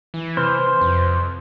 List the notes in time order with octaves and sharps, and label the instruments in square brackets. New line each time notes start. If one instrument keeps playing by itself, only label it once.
[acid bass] E3
[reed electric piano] C3 B4 F6 [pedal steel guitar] C5
[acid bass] F2